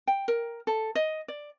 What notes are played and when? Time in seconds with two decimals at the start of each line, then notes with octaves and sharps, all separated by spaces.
0.07 G5
0.28 A#4
0.67 A4
0.95 D#5
1.28 D5